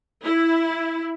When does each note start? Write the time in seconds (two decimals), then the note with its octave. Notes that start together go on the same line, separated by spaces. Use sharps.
0.23 E4